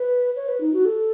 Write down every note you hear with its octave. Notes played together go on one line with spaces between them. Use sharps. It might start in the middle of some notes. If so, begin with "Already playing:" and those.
Already playing: B4
C#5
B4
D#4
F#4
A4